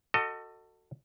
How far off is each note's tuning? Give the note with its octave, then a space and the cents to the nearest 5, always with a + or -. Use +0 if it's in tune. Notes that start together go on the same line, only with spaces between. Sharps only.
F#4 +0 A4 +25 D#5 -5